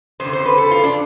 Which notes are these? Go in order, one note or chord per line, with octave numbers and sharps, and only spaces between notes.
F2 D3 C5
C5
B4
A4
F4
D4